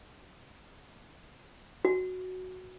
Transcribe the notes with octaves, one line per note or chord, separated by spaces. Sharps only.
F#4